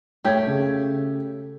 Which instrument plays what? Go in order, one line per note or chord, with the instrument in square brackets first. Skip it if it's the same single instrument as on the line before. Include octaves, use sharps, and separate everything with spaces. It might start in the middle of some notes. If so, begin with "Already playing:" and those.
[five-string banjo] A3 G4 [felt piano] C#5 G#6
[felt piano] C#3